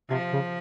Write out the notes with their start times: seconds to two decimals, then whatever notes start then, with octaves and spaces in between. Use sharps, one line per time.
0.09 C3 F3
0.33 C#3